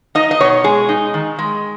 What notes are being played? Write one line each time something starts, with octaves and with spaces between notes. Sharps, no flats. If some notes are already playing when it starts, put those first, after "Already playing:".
D#4 D#5
D#5
B2 C#5
G#3 G#4
D#4
D#3
G#3